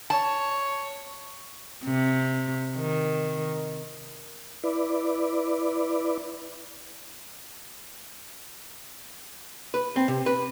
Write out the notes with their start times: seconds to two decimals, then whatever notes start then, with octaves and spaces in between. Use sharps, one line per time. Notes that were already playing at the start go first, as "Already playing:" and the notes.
0.10 C#5 A5
1.84 C3
2.77 D#3
4.64 E4 B4 D5
9.74 B4
9.96 C4
10.08 C3
10.26 B4